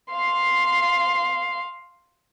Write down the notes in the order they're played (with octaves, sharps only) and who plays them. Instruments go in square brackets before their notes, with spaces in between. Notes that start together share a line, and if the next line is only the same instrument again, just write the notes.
[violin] F5 C6